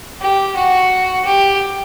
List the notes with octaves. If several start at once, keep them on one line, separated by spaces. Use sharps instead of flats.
G4
F#4
G4